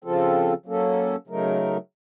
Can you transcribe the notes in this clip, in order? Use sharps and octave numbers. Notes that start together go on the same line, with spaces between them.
C#3 F3 C4 F4 A4
F#3 A#3 C#4 A4
C#3 F#3 A3 D#4 A#4